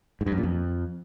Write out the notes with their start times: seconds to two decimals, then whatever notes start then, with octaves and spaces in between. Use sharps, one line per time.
0.21 G#2
0.26 G2
0.32 F#2
0.38 A#2
0.43 F2